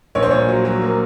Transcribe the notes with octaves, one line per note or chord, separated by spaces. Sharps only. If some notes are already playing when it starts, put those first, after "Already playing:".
A#1 C#5
C5
A#2 C#5
F#3
F#3
A#3